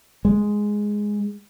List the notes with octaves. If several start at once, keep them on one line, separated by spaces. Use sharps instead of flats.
G#3